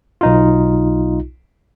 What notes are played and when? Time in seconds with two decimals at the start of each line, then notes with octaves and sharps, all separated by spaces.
0.21 B1 D#4 F4